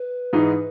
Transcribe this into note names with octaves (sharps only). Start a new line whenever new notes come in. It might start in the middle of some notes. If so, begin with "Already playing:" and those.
Already playing: B4
G#2 E3 G#3 D#4